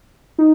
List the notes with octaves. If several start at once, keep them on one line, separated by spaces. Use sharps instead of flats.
D#4